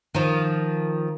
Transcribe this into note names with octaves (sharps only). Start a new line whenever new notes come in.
D#3 F3